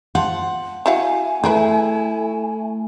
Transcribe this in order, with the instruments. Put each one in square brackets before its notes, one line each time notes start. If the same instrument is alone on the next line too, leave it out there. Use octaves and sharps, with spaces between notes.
[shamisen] F3 [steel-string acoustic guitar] F#5
[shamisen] E4 F#4 F5 [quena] G#5
[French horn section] A3 [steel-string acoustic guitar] E4 [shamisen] G#4 A#4 B4